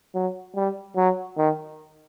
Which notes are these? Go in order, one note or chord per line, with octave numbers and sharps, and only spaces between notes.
F#3
G3
F#3
D#3